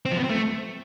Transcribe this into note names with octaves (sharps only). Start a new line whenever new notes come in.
C4
F3
B3
C4
A3